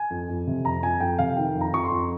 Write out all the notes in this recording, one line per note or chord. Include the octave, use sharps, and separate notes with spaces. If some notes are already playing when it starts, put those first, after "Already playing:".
Already playing: G#5
F2
F2
C3
F2 A#5
F2 G#5
F2 G5
C3 F5
D#3 G5
F2
A#5
F2 C#6
C6
F2